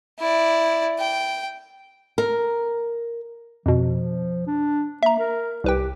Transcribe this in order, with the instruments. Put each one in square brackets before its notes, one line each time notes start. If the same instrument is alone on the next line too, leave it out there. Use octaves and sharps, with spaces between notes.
[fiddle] E4 D5
G5
[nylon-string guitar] A#4
[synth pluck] F2 B2 [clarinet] F3
[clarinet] D4
[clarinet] A#3 [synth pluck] E5 A#5
[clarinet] A#4
[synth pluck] C2 B4 G5 [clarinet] G4